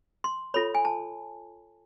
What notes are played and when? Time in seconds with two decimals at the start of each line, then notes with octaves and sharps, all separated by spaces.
0.24 C6
0.54 F4 A4 C#5 B5
0.75 G#5
0.85 A5